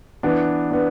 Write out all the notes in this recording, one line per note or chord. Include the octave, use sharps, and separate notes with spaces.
E3 B3 D4
B3 D4